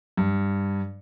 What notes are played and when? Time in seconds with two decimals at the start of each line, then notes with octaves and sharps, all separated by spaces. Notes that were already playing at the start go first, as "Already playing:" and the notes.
0.17 G2